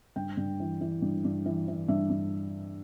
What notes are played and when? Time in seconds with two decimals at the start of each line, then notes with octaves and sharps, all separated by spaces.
0.16 G2 G5
0.37 G2
0.60 E3
0.81 E3
1.02 G2
1.25 G2
1.46 E3
1.68 E3
1.88 G2 E5
2.10 G2